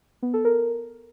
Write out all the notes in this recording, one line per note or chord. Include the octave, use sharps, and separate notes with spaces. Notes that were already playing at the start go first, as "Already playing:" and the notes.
B3
A4
A#4